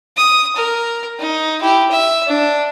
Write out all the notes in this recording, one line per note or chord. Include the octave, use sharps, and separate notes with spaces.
D#6
A#4
D#4
E4 G4
E5
D4